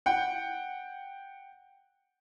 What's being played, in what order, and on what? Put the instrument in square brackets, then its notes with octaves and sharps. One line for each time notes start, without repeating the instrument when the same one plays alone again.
[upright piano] F#5 G5